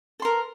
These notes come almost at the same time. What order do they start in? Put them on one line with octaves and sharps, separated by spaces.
A4 C6 A#4